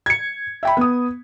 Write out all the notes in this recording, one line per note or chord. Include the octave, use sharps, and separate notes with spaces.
G#6 C#7
E5 G5 B5
B3 D#6